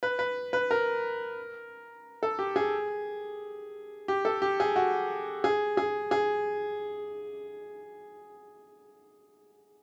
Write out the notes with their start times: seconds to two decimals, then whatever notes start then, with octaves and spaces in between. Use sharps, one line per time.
0.03 B4
0.19 B4
0.53 B4
0.71 A#4
2.23 A4
2.39 G4
2.56 G#4
4.08 G4
4.25 A4
4.42 G4
4.60 G#4
4.76 F#4
5.44 G#4
5.77 G#4
6.11 G#4